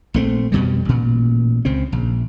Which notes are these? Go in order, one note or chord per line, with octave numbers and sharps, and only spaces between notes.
A#1 A3 C4
F2 B2 G3
A1 A#2
C#2 C#3 C4
A#1